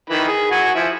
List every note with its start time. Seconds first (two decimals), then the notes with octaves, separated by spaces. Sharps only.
0.10 D#3 E3 B5
0.27 G#4
0.51 F#4 G#5
0.75 F3 E4